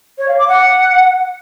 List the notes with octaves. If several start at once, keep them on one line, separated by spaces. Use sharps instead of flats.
C#5
F5
D6
F#5